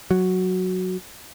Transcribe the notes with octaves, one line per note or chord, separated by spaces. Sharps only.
F#3